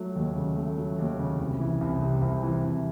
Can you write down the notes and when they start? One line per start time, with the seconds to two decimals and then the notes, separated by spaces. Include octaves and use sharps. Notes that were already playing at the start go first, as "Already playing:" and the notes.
Already playing: F#3 A3
0.16 D#2
0.35 C#3
0.56 A3
0.77 F#3
0.98 D#2
1.19 C#3
1.39 C2
1.60 E3
1.81 C2
2.02 C3
2.21 C2
2.43 E3
2.64 C2